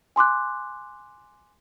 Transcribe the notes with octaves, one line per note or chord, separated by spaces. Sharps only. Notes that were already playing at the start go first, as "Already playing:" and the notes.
G#5 C6 D6 F#6